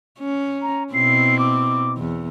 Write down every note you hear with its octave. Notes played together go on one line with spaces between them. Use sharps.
C#4
A#5
B2 C4 E4 C7
D6
E2